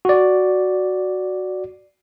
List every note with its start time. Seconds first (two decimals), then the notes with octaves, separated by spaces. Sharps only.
0.05 F#4 D5